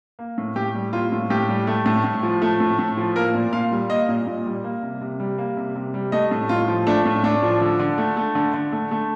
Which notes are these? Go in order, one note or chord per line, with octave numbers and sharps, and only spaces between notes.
A#3
A2
A2 G4
G3
A#3 F4
A2
A2 G4
G3
A3
A2
A2
F3
A3
A2
A2
F3
A#3 A#4
A#2
A#2 F5
G3
A#3 D#5
A#2
A#2
G3
A#3
C3
C3
G3
A#3
C3
C3
G3
A3 D#5
A2
A2 F4
F3
A3 D4
A2
A2 D4
F3
D3
D3
A3
A3
D3
D3
A3
A3